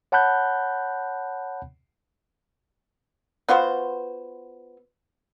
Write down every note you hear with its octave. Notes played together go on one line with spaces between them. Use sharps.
C#5 F#5 A5 B5 F#6 G6
B3 F4 F#4 C5